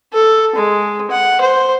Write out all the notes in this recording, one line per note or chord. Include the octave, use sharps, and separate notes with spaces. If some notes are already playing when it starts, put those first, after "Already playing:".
A4
G#3
F#5
C5